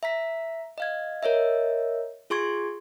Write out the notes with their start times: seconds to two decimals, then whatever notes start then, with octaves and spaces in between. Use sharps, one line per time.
0.03 E5 A#5 B6
0.78 D#5 F5 G#6
1.23 A#4 C#5 D#5 E5
2.30 F4 G#4 C6 C#6 G#6